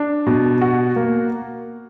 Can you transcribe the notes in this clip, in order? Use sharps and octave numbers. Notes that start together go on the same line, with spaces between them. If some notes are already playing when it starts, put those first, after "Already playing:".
Already playing: D4
B2
F#4
A#3